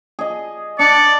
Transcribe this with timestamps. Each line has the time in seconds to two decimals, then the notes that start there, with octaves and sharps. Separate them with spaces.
0.19 G#4 D#5
0.79 D4 D5 C#7